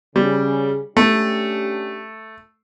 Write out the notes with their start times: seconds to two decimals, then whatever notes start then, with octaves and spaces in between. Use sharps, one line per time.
0.16 C#3 G3
0.97 A3 C#4 D4 G4